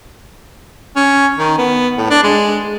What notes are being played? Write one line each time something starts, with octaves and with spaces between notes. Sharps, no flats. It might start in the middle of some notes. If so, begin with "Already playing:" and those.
C#4
D#3
B3
A2
D4
G#3